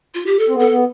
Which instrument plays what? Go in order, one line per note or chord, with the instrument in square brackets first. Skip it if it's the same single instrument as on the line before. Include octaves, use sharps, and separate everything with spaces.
[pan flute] F4
G4
A4
[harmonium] C4
[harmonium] B3 [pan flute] A4
[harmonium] B3